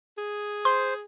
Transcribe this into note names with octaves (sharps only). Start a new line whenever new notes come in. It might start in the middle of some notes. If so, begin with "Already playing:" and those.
G#4
C5 C6